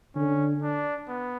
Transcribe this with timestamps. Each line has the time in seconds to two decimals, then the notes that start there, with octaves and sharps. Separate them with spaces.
0.15 D3 C#4
0.62 D4
1.08 B3